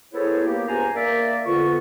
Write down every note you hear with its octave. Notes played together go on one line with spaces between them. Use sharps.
B3 E4 G#4 A4 C5 C#5
A#3 B3 G4
C#2 D4 C5 G#5 A#5
A#3 A#4 D5 E5
F2 D3 B3 F4 B4 C#6